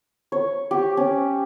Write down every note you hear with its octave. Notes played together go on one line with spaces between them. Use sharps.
C#5
G4
C#4